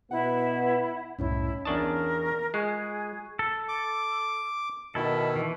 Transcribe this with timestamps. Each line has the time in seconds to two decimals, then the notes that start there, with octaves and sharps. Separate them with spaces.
0.11 B2 B3 E4 F#5
1.19 C2 F#2 A2 C#4 D#4 E4 C#5
1.65 E2 D4 A#4 A5 C#6 D#6
2.54 G#3 F4 G#4 C#6 F#6 C7
3.39 A4
3.68 D6
4.95 B2 D#3 E4 A4
5.36 E3